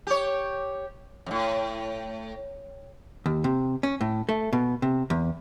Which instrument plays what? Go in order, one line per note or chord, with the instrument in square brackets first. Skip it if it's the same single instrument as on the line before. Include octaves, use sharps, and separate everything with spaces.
[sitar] G4 C#5
F2 A2
[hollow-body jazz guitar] D#2
C3
C#4
A2
A3
B2
C3
E2